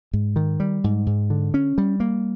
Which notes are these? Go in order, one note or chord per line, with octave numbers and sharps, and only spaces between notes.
G#2
D#3
G3
G#2
G#2
D3
C#4
G3
A#3